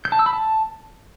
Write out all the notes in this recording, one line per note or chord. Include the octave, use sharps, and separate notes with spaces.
G6
A5
E6
B5
A5